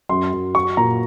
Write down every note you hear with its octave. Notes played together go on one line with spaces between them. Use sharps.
F#2 C6
F#2
F#3 C#6
A#2 A#5